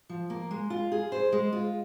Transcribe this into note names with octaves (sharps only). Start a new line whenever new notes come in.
F3
A#3
G#3
F4
G#4
C5
G#3
F4